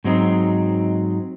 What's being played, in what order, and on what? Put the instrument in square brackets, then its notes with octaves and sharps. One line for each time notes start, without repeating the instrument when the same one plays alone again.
[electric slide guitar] G#2 F#3 C4 D#4